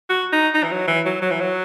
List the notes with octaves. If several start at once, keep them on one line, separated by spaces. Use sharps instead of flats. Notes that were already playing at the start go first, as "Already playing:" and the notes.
F#4
D#4
D#4
E3
F#3
E3
F#3
F#3
E3
F#3